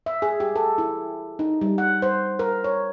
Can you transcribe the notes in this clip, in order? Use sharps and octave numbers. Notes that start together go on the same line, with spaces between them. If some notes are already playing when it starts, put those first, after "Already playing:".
E5
G#4
G4
A4
E4
D#4
G3
F#5
C5
A#4
C#5